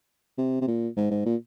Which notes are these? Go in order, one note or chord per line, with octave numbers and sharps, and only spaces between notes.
C3
C3
A#2
G#2
G#2
A#2